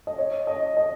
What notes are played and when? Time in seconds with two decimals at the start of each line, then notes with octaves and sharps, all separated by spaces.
0.07 D#5
0.18 C#5
0.47 D#5
0.77 D#5